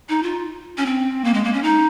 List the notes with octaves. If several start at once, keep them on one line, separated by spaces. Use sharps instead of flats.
D#4
F4
C#4
C4
A#3
G#3
A#3
C#4
D#4